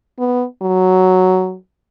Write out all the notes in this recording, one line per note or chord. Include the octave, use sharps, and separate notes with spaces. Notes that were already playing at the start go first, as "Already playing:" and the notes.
B3
F#3